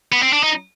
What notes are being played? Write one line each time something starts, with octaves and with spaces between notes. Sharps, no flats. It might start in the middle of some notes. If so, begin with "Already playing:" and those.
B3
C4
D4
D#4